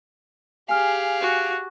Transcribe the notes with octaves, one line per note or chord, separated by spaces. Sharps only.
G4 G#4 F5 G#5 F6
F#4